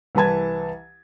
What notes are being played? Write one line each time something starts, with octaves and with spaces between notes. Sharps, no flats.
C2 E3 B4 A5 G#6